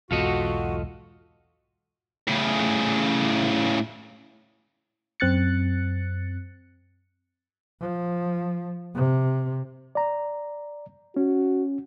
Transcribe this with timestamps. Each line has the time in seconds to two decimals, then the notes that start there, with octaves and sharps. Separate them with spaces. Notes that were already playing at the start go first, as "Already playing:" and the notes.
0.11 B1 E2 G#2 F4 F#4 A4 D#5
2.27 A2 C#3
5.20 F#2 C4 F#6 A6 C#7
7.80 F3
8.95 C3
9.95 D5 A#5
11.16 C#4 F#4